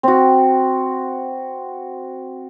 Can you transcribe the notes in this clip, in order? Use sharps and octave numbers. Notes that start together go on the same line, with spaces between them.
C4 F#4